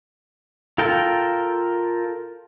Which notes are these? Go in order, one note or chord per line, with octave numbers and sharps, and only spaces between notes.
F4 A4 A#4 G5